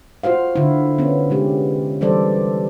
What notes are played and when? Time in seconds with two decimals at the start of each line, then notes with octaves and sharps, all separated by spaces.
0.23 F4 F#4 C5 F5
0.56 D3 E4
0.98 B3 C#4
1.30 C3 G#3 G4
2.01 E3 G3 A4 C5 D5